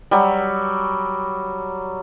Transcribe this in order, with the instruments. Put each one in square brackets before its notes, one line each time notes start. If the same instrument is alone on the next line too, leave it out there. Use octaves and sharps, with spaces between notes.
[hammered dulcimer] F#3 G3